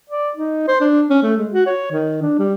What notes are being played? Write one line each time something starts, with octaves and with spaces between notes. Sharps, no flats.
D5
D#4
C5
D4
C#4
A3
G#3
F#4
C#5
D#3
D4
G3